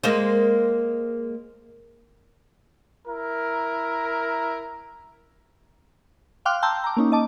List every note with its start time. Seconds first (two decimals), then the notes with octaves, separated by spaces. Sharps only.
0.04 G#3 A#3 C5
3.06 E4 A#4
6.45 F5 G5 C6 D6 F6 F#6
6.62 G5 A5 A#5 C6 E6 G6
6.84 A#5 D6
6.97 A#3 C#4 D#4
7.12 D#5 A5 D6